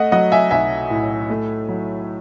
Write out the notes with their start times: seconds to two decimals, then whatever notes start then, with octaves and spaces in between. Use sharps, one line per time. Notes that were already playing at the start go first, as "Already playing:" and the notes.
Already playing: A3 D#5 F#5
0.12 F#3 D#5 F#5
0.32 E5 G#5
0.51 B1 E5 G#5
0.90 A2
1.30 A3
1.69 F#3